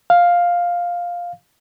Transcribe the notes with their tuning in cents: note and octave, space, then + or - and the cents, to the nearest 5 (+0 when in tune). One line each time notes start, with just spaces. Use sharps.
F5 +5